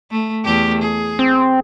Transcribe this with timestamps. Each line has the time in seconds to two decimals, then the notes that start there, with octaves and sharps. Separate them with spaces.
0.11 A3
0.44 E2 A3 G4
0.82 G#4
1.19 C4